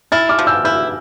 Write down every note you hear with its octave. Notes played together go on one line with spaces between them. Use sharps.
E4 F6 A6
D6 F6
F3
E6 G6
E4 E6 G6